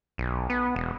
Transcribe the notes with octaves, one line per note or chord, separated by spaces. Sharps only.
B1
B3
E1